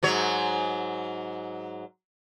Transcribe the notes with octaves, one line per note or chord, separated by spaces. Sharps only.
G#2 F#3 C#5